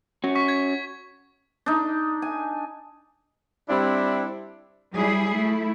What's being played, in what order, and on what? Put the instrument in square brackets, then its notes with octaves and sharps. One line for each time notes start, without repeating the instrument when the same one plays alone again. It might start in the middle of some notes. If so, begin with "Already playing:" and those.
[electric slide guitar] C#4 F#4
[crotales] C#6 B6
G#6 B6
[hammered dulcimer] D4 D#4
G#5
[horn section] G3 C4 D4 E4
[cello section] F#3 G3 E4 G#4
A3 E4